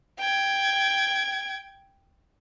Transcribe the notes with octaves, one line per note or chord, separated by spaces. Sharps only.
G5 G#6